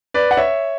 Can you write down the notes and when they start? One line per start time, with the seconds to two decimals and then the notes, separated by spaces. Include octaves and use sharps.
0.14 B4 D5
0.31 F#5
0.37 C#5 E5